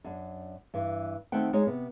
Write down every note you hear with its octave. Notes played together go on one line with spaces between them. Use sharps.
F#2 D4
G2 E3
D#3 A3 C4 F#5 G5
G#3 D#4 C#5 D#5
C3 B3